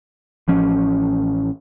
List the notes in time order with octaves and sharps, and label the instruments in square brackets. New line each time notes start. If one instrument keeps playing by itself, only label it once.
[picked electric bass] A1 F3 C#4